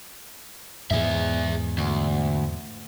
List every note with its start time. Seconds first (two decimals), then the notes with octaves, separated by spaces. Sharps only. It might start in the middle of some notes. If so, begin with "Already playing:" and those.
0.91 E2 G#2 G#4 E5
1.78 D2